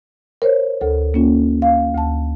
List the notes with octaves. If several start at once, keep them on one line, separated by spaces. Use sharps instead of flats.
A#4 C5 C#5
D2 A4
A#3 C#4 F4
F5
D2 A5